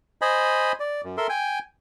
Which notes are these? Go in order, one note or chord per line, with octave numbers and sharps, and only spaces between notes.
C5 D#5 G#5 B5
D5
F#2
A4 A#4 E5 C6
G5 G#5